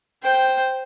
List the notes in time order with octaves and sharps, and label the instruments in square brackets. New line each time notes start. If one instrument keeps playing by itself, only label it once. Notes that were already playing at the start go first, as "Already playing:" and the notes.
[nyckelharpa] C5 G5